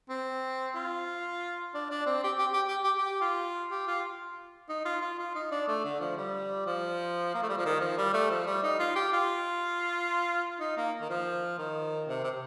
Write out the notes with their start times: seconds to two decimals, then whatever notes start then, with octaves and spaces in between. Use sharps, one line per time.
0.10 C4
0.75 F4
1.74 D4
1.91 D4
2.06 C4
2.24 G4
2.38 G4
2.53 G4
2.68 G4
2.84 G4
2.98 G4
3.21 F4
3.71 G4
3.87 F4
4.69 D#4
4.85 F4
5.02 F4
5.19 F4
5.35 D#4
5.52 D4
5.67 A3
5.84 D3
6.00 F3
6.17 G3
6.66 F3
7.35 A#3
7.43 A3
7.49 G3
7.58 F3
7.65 D#3
7.81 F3
7.98 G3
8.14 A3
8.30 F3
8.47 G3
8.63 D#4
8.79 F4
8.96 G4
9.13 F4
10.60 D#4
10.77 A#3
11.02 D#3
11.10 F3
11.58 D#3
12.08 C3
12.24 C3